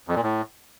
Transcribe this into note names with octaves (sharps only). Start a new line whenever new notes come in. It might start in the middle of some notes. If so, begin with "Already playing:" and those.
F2
A#2
A2